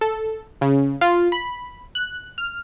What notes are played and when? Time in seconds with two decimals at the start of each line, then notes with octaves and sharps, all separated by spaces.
0.01 A4
0.61 C#3
1.01 F4
1.32 B5
1.95 F#6
2.38 F6